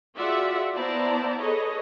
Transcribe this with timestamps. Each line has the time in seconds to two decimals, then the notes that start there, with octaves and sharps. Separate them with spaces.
0.16 F4 F#4 G#4 D5 E5 F#5
0.75 B3 E4 C5 D5 A5 A#5
1.41 G#4 A4 B4 C#5 D#5